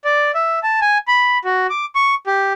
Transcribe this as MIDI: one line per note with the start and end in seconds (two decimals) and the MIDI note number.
0.05 0.31 74
0.35 0.59 76
0.63 0.80 81
0.81 0.98 80
1.08 1.38 83
1.45 1.67 66
1.70 1.85 86
1.95 2.15 85
2.27 2.53 67